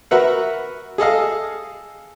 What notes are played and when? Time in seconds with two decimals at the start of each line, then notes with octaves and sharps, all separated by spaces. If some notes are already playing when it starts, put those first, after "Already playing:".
0.11 F#4 A#4 B4 E5 F#5
0.98 G#4 A4 D#5 F5